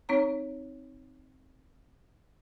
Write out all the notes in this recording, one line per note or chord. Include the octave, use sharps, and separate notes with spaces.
C4 D#4 C#5 A#5